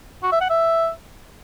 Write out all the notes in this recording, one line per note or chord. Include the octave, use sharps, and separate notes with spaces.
F#4
E5
F#5
E5